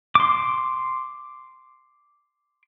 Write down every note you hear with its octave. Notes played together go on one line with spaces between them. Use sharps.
C6 D6